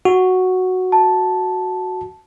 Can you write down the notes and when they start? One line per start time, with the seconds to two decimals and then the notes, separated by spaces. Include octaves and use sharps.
0.05 F#4
0.92 A5